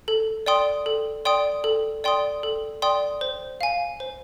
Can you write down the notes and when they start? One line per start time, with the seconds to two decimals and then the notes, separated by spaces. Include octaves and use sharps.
0.08 A4
0.46 D5 G5 C6 D#6
0.86 A4
1.25 D5 G5 C6 D#6
1.64 A4
2.04 D5 G5 C6 D#6
2.43 A4
2.82 D5 G5 C6 D#6
3.21 C5
3.61 F5 G#5
4.00 C5